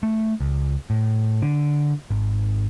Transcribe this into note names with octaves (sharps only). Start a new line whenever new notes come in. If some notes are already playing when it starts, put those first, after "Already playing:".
A3
C#2
A2
D3
G#1